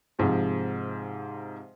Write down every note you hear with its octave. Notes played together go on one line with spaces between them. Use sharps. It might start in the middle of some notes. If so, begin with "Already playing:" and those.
G#2 C3 F3 G#3 C4